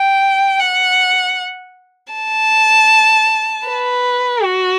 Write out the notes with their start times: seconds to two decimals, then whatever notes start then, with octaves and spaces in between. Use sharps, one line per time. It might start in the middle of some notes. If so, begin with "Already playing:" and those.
Already playing: G5
0.60 F#5
2.13 A5
3.67 B4
4.43 F#4